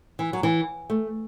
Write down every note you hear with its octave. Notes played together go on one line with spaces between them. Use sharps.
E3
F#3
E3
A3